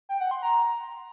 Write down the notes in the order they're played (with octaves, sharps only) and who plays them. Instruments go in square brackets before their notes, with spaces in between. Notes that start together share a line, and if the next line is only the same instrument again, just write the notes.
[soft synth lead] G5
F#5
C6
A#5